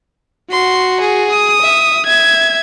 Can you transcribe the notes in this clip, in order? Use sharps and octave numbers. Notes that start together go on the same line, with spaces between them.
F#4 C6
G#4
D#6
E5
E5 G#6